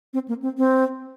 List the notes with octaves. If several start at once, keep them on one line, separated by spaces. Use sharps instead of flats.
C4
A#3
C4
C4